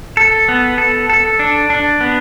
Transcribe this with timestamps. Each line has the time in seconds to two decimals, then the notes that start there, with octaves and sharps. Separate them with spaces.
0.17 A4
0.49 B3
0.78 A4
1.10 A4
1.39 D4
1.70 D4
2.01 B3